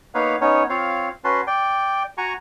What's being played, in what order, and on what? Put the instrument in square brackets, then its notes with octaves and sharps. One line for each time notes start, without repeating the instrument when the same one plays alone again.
[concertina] A#3 B3 D#4 B4 C#5 F5
B3 C#4 D#4 C#5
C4 F4 C#5 F5
C#4 F#4 B4 A5 C6
D5 G5
F#4 G#5 A#5 C#6